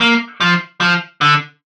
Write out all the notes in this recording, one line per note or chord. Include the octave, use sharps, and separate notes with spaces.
A#3
F3
F3
D3